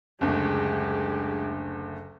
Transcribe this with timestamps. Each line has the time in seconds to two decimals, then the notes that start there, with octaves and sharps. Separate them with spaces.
0.21 F#1 D2 G#3 G4